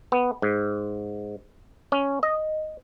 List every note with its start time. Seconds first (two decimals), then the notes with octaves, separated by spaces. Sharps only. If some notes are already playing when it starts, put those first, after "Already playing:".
0.12 B3
0.42 G#2
1.92 C#4
2.23 D#5